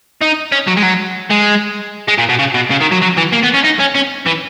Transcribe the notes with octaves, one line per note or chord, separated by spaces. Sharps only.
D#4
C#4
F#3
G#3
F#3
G#3
G#3
A#2
B2
C#3
B2
C#3
D#3
F#3
F#3
E3
A#3
B3
C#4
D#4
C#4
C#4
E3